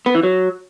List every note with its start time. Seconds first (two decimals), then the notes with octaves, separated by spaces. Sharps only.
0.06 B3
0.15 E3
0.23 F#3